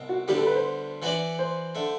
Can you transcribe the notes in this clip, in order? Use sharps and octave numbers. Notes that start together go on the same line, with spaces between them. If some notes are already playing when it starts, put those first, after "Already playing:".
Already playing: C2 B2 C4
F#4
D2 D3 G3 B3 G4
A4
B4
C5
E3 B3 F#4 B4 D5
C5
D3 A3